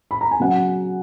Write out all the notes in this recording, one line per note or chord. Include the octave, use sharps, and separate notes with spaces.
B5
A#5
G#5
C#3 F#3 F#5